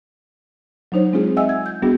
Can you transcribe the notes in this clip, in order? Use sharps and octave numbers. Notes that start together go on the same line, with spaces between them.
F#3 D4 D#4 C5 C#5
G#3 C4 D4 F4 G#4
D#5 E5 F#5 G#5 E6
G#6
G6
G3 B3 D4 F#4 G#4